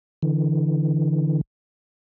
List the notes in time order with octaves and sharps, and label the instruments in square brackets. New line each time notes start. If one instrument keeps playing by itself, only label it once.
[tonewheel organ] D3 E3